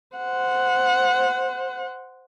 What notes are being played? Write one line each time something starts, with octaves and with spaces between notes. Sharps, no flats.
C5 F#5